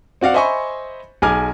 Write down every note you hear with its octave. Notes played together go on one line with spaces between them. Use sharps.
C4 F#4 D5 F5 F#5
C5 D#5 E5 G#5 B5 C#6
B1 G#4 G#5 D6 F6 G#6